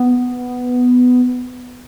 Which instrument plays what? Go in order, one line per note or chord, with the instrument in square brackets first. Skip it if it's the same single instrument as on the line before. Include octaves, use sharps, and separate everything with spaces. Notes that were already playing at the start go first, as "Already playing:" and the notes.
Already playing: [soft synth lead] B3